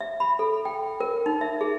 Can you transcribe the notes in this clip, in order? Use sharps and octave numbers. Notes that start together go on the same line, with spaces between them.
E5
B5
A4
G5
A#4
D#4
E5
G#4